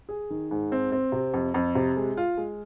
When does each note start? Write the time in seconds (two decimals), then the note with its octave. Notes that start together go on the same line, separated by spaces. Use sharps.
0.09 G#4
0.30 D#3
0.51 G#2
0.72 C4
0.92 C4
1.12 C3
1.34 F2
1.54 F2
1.75 C3
1.97 G#3
2.17 F4
2.37 G#3